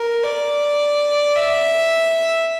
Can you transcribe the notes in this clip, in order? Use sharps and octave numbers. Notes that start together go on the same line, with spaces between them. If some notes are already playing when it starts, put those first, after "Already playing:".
Already playing: A#4
D5
E5